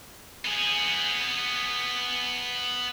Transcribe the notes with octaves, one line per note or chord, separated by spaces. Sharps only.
B3 G#4